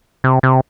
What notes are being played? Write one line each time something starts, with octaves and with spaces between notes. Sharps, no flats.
C3
C3